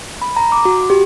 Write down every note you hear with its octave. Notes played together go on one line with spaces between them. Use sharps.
B5
A#5
D6
F#4
G4